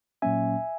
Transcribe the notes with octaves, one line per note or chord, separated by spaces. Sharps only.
A#2 F#3 A#3 C#4 E5 G#5